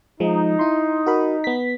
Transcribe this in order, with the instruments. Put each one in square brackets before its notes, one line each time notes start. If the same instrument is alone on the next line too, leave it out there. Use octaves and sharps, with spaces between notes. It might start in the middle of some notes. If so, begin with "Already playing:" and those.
[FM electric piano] F3 G#3 [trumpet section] D#4
[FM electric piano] E4 C6
F#4 A#4 B5
B3 B6